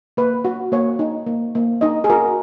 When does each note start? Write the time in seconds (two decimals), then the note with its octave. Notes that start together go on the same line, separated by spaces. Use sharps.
0.17 A#3 B4
0.45 F#4
0.72 A#3 C#5
0.99 D#4
1.26 A#3
1.55 A#3
1.81 D#4 D#5
2.04 G#4
2.10 F#4 A#4